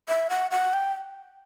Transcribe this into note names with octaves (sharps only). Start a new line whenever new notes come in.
E5
F#5
F#5
G5